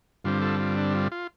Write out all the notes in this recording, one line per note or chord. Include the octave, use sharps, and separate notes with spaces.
G2 D3 G3 C4 F4
F4 A4
F4
D4
F4
F4